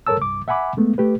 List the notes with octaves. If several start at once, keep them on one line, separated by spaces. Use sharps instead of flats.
G2 A4 A#4 C#5 A5 E6
C2 G2 D6
E5 F#5 G#5 B5 D6
G#3 A3 B3
A3 G4 B4